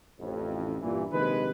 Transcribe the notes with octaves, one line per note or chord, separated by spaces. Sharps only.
A1 F2
G2 A#2 E3
A#1 C3 D#3 G#3 B4